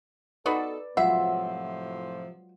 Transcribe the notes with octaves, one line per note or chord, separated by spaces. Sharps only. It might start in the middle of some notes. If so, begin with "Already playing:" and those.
B3 D#4 F#4 A4 B4 D5
A2 C3 F3 F#3 G#3 F4 E5 F#5